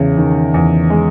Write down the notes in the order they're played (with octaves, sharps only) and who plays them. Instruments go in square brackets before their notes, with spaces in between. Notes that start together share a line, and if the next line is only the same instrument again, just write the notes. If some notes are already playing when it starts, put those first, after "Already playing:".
Already playing: [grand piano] E2 [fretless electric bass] C#3
[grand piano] D#3
E2
G#3